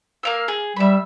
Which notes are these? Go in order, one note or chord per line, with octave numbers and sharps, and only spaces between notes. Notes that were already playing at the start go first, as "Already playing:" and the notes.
A#3 F5 E6
G#4
G3 E5 B5